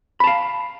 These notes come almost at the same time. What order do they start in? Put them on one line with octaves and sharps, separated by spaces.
B5 A5 F5